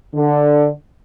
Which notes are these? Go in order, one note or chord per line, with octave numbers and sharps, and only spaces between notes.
D3